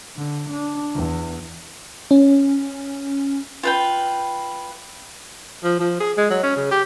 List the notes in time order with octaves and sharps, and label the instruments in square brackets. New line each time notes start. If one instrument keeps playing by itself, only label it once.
[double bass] D3
D4
E2
[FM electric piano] C#4
[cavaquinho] F4 B4 G5
[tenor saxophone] F3
F3
G#4
G#3
F#3
C#4
C#3
G4